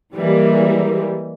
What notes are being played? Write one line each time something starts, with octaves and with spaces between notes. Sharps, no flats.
E3 G3 G#3 A#3